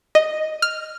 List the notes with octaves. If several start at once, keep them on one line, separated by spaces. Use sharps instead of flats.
D#5
F6